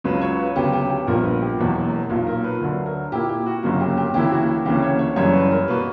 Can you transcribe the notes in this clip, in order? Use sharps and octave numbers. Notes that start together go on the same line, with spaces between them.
C#2 C#3 F#3 B4
C#5
B4
D2 C#3 F#3 B3 G4
G4
G4
A#1 A#2 G3 B3 A#4
B4
G4
E1 E2 B2 F#3 A#3
B1 A#2 F#3 A#3
A#4
B4
D2 D3 F#3
A#4
A#2 A#3 E4 G4
G4
F#4
G1 F#2 C#3 F#3 A#3 A#4
G4
G4
D2 C#3 E3 A#3 E4 G4
F#4
G4
D2 C#3 E3 A#3 C#4 G4
C#5
C#5
F#1 F#2 C#3 E3 G3 C#5
B4
A#4
B2 A#3 B4